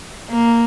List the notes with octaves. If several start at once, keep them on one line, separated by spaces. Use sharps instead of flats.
A#3